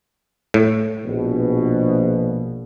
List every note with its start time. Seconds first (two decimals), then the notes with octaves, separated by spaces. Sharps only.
0.54 A2
1.04 A#1 B2